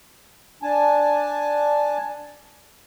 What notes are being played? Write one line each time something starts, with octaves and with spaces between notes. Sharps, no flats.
D4 G#5 A5